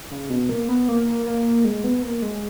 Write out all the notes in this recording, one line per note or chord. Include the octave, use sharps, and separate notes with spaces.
C#3
B2
A#3
B3
A#3
A#3
G#3
B3
A#3
G#3